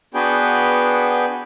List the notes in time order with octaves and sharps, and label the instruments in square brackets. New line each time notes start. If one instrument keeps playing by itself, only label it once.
[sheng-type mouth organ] B3 D4 F#4 G#4 B4 G5